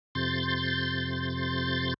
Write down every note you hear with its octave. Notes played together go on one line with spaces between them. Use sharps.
F2 C3 C6 G6 A6